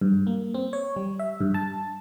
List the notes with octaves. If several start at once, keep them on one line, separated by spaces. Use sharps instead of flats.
G2
A#3
C4
C#5
G3
E5
G2
A5